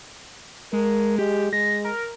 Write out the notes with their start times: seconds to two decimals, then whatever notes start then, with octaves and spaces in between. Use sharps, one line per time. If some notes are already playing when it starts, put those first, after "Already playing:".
0.73 G#3 A#4
1.19 G#3 G4
1.53 G#3 A#6
1.85 A#4